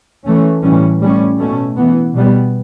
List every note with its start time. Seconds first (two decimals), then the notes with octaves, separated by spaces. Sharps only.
0.25 E3 A3 C#4
0.63 A2 E3 G3 C#4
1.00 A2 G3 C#4
1.38 B2 A3 C#4
1.76 E3 B3
2.14 B2 G3 B3